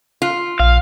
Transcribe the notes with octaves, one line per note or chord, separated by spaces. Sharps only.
F4
A#1 F5